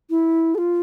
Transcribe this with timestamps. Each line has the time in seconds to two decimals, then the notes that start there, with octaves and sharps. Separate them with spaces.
0.10 E4
0.55 A4
0.58 F4